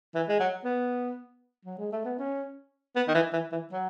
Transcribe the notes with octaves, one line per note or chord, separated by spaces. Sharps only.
E3
G#3
F#3
B3
F#3
G#3
A3
B3
C#4
B3
D#3
E3
E3
E3
F#3